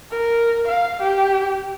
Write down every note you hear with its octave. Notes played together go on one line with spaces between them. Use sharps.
A#4
F5
G4